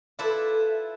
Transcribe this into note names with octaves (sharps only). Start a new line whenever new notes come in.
E4 F4 A4 B4 D5 E5